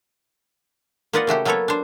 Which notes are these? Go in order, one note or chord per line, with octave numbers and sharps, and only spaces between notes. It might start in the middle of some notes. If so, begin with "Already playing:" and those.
A#3 F4 B4 D5 D#5 F#5
C#3 A3 F#4 G4
F#3 A#3 B3 A4 B4 C#5
D4 C5